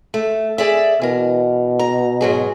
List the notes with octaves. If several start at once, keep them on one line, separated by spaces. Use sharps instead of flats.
A3
G#4 D5 E5
B2 E3 A#4
A#5
G#2 F#3 G#4